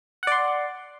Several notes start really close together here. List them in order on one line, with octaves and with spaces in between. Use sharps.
F#5 D5 C6